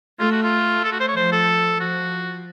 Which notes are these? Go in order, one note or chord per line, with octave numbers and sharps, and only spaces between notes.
A3 F4
F#4
F4
A4
F#4
C5
C#5
F3 C5
A4
F3 F#4